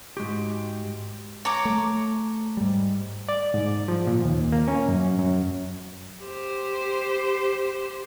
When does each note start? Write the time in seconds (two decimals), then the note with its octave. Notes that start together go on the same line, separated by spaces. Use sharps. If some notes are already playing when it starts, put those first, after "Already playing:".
0.17 G#2 G#3 F#4 G4
1.45 C#5 A#5 D6
1.65 A3
2.57 G#2 G3
3.29 D5
3.54 G#2
3.88 F3
4.07 A#2
4.24 D#2
4.52 A#3
4.68 C#4
4.89 F#2
5.19 F#2
6.22 G4 C5